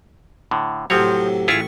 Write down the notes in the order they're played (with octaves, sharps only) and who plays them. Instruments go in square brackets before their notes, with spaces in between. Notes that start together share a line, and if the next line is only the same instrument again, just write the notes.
[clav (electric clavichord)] A2 D3
[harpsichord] A2 C3 F#3 [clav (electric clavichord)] F3 C4 C#5
[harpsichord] A1 C#6 [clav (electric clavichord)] E4 F4 G#4